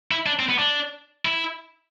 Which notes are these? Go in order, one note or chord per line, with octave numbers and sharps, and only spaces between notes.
E4
D4
C4
B3
D4
E4